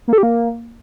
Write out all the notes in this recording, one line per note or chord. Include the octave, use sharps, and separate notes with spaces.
A#3
A4
G4
A#3